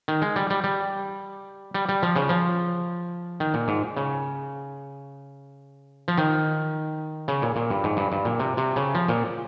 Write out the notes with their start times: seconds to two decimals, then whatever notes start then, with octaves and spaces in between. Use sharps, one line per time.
0.08 D#3
0.22 G#3
0.36 G3
0.50 G3
0.64 G3
1.74 G3
1.89 G3
2.03 F3
2.16 C#3
2.29 F3
3.40 D#3
3.54 A#2
3.68 G#2
3.97 C#3
6.08 F3
6.18 D#3
7.28 C#3
7.42 A#2
7.56 A#2
7.70 G2
7.84 G#2
7.97 G2
8.12 G2
8.25 A#2
8.39 C3
8.57 C3
8.76 C#3
8.95 F3
9.08 A#2